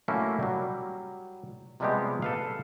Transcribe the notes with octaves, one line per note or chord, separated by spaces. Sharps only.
F#3 A3 A#3 C#4 E4
F#3 G3
C3 F3 G3 G#3 B3 G4
A4 B4 F5